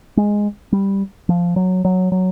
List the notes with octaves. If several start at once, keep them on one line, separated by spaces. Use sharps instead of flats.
G#3
G3
F3
F#3
F#3
F#3